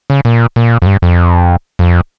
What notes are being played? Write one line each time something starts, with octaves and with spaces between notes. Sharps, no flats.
C#3
A#2
A#2
F2
G2
F2
F2